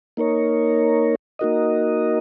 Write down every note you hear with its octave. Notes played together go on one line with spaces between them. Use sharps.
A#3 D#4 A#4 C#5
A#3 D#4 F#4 A#4 D#5